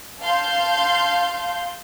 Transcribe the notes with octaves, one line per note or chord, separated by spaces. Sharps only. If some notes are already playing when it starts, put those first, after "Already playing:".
F5 A5 C6 G6